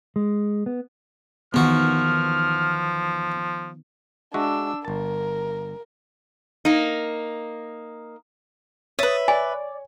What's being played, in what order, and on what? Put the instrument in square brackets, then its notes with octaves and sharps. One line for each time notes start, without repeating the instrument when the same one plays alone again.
[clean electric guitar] G#3
B3
[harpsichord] E2 F#4 [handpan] D#3 B3 [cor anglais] F3 [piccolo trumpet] F6
[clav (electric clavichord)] G#3 F#4 E5 [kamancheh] D4 E6
[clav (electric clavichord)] G1 A5 [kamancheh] A#4
[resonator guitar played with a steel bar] A#3 D#4
[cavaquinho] B4 E5 [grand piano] C#5 [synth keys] D#6 A6
[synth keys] D5 [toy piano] G#5